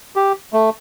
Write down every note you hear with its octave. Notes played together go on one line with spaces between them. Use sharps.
G4
A3